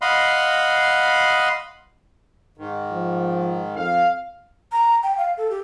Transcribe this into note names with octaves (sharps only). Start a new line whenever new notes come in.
D#5 F5 F#5 B5 C6
G#2 D#3
F3
F2 F5
A#5
G5
F5
A4
G4